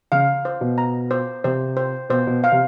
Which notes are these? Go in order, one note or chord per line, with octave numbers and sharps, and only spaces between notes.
C#3 F5
C5
B2
A#5
C5
C3 C5
C5
B2 C5
B2
F5
C3